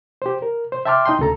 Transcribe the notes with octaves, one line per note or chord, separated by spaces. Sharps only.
G4 C5
A#4
C5
E5 G5 A5 C6 D6 F6
D#4 D#5 G5 C6
D2 C#3 A4 A#5